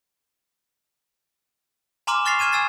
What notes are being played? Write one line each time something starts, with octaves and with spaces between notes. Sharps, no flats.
G#5 A#5 C6 D6 F6 E7
C#6 F6 A6 A#6 C7 F7
C#6 F6 G#6 D#7 E7
G#5 E6 F6 A6 C7